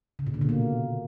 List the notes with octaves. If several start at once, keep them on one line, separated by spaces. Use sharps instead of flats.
C#3
A#2
D3
B2
A#3